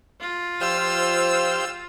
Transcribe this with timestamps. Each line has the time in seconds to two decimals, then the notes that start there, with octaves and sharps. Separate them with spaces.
0.21 F4
0.61 F3 G4 C5 F5 E6